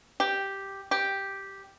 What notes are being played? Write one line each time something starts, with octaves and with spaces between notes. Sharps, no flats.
G4
G4